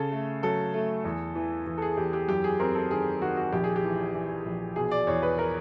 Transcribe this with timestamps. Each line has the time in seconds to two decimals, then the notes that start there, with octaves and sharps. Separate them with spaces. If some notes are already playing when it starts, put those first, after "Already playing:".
Already playing: C#3 A4
0.12 A3
0.43 F#3 A4
0.74 A3
1.04 E2
1.35 E3
1.67 E3
1.78 A4
1.82 G#4
1.97 E2 G4
2.13 G4
2.28 F#2 G4
2.44 G#4
2.60 C4 A#4
2.75 A4
2.90 D#3 G#4
3.21 D#3 F#4
3.37 F#4
3.52 A#1 G4
3.64 G#4
3.76 G4
3.83 E3
4.15 E3
4.45 A#1
4.76 B2 G#4
4.91 D5
5.07 E2 C#5
5.22 B4
5.38 A#4